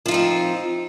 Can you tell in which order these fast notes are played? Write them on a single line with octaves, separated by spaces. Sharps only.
F3 F4 D#4 C4